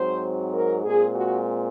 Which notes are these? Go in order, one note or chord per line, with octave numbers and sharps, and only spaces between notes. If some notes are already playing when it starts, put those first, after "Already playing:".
Already playing: G#2 F#3 C4 C5
A#4
A#2 G#3 C4 G#4
F#4